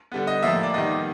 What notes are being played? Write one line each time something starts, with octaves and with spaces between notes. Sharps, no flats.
D3 G3 B3
D#5
A2 F3 A#3 E5
D5
D#3 G3 B3 D#5